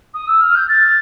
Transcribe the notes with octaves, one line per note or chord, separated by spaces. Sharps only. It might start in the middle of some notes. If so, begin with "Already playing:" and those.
D#6
E6
F6
G6
A6